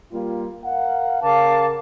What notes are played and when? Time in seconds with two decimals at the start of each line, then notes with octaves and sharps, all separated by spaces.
0.12 G3 A#3 F4
0.64 A#4 F5 F#5
1.22 C#3 A#4 F5 A5 D6